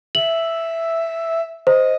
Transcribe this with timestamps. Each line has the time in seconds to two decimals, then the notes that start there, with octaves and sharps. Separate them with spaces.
0.15 E5 F#7
1.67 C5 D#5